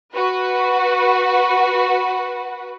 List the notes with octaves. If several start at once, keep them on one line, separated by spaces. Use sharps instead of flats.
F#4 B4